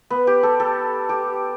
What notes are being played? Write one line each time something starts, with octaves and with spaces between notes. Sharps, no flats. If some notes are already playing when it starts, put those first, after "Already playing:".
B3
G4
A4
A4
G4